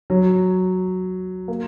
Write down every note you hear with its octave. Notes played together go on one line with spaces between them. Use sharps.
F#3
A#3